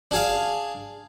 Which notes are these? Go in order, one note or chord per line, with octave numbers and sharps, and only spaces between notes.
D4 G#4 F5